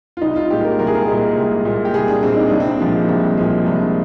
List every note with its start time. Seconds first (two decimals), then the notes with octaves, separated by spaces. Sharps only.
0.17 F4
0.22 C2 D#4
0.36 F4
0.50 A#2 G#3 G4
0.65 A#4
0.79 C2 A#4
0.87 G#4
0.95 A#4
1.08 A#2 G#3
1.36 C2
1.65 A#2 G#3
1.85 G4
1.94 C2 G#4
2.08 D4
2.23 A#2 G#3 C4
2.37 D#4
2.49 C2 D4
2.60 C4
2.72 D4
2.80 A#2 F3 G#3
3.09 C2
3.37 A#2 F3 G#3
3.66 C2 D4